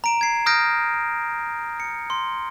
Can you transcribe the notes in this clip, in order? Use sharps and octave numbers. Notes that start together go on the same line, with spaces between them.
A#5 D7 E7
G#6 C7
D#6 F6 G6 A#6 D7
C#7
C6